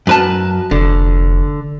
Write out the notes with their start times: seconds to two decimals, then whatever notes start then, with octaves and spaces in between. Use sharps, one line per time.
0.07 F#2 B4 A5
0.71 F1 D3